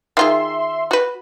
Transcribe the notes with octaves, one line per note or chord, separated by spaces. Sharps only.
D#3 F4 G#4 E5 C6
F#4 B4